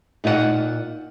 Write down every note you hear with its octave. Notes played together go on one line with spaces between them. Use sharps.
A#2 D#4 F4 C#5 F#5